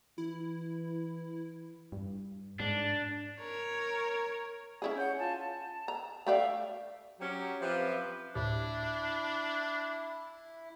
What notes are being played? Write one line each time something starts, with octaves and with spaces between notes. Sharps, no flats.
E3 E4
G2
G#2 D4
A#4 C#5
C#4 E4 G#4
C#5 F#5 G6
F4 G#5 A5
A5
A#5
A3 G4 D5 E5 F5
F#3 C#4 G4
F3 C4 F4 G4 B4 E5
D2 A2 D4 E4 G4